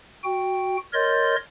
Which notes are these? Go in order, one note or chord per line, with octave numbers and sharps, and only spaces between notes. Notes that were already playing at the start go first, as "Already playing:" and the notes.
F#4 G5
A#4 C#5 D#5 C6 G6 A6